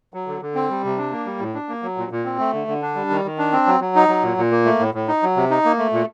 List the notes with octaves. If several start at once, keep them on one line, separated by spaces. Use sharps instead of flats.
F#3
D3
D3
C4
G3
C3
D4
A#3
G3
A2
D4
A#3
F#3
A#2
A#2
C4
A3
D3
D3
D4
G3
D#3
D#3
D4
C4
F#3
F#3
D#4
F#3
A#2
A#2
A#3
A3
A2
A2
D#4
F#3
C3
D#4
A#3
A3
A#2